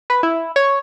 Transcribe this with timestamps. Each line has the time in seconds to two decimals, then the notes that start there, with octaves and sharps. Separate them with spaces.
0.10 B4
0.23 E4
0.56 C#5